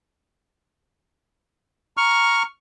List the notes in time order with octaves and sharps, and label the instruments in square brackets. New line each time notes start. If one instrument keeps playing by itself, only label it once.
[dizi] A#5 [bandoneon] C#6 F6